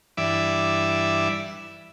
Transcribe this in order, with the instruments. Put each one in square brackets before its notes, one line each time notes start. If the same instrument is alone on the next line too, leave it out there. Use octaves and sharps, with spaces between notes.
[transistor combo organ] G2 E3 D5 E5